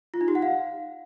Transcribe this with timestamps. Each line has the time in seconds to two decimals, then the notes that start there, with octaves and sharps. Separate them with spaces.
0.14 F4
0.21 D#4
0.28 G4
0.35 F#5
0.42 F5